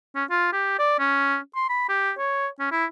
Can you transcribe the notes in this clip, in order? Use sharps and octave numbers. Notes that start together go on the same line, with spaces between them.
C#4
F4
G4
D5
C#4
C6
B5
G4
C#5
C#4
E4